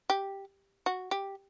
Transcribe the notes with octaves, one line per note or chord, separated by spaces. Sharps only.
G4
F#4
G4